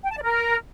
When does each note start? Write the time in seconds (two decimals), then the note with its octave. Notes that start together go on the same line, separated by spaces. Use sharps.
0.05 G5
0.11 A5
0.17 D5
0.23 A#4